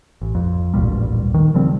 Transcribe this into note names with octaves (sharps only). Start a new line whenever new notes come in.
A1
F2
A1 D2 A#2 G3
D#3
C#3 F3 G3 C4